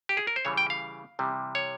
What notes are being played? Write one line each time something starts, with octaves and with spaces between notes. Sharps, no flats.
G4
G#4
A#4
C5
C#3 E3 G3 C#5
G5
F5
C3 E3 G3
C#5